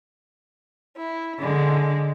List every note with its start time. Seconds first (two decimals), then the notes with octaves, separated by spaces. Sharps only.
0.98 E4
1.40 D3 G#3